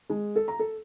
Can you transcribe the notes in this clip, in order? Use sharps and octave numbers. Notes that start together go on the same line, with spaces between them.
G#3
A4
A#5
A4